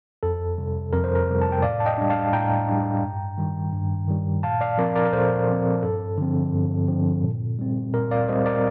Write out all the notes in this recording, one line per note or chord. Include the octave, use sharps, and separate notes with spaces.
F2 A4
C3 G3
F2 A#4
C5
A#4
C3 G3
A5
G5
A2 D5 F5
A5
D#5 G5
G3 D4
F5 A5
A2 G5 A#5
G3 D4
G2
D#3 G3
G2
D#3 G3
A#2 F5 A5
D5 F5
F3 C4 A#4 D5
A#4 D5
A#4
A#2 A4 C5
F3 C4
G2 A4
D3 F3 C4
G2
D3 F3 C4
A#2
G3 C4
A#2 A#4
D5 F5
G3 C4 C5 D#5
A#4 D5